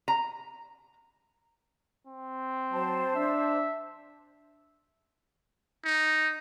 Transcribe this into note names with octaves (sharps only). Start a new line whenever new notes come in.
A#5
C4
F#3 C5 A5
D4 E5
D#4